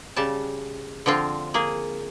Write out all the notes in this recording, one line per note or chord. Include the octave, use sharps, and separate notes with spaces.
C#3 G3 A5
D3 F3 C4 F4
A#3 G#4